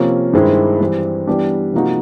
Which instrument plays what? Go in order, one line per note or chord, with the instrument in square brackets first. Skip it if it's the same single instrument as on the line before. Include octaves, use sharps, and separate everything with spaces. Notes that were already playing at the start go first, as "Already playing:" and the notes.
Already playing: [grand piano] C3 F3 A#3 C#4
G2 D#3 G#3 C4 E4
E3 G3 C4
E3 G3 B3 D4 G4
C3 F3 A#3 D#4 F#4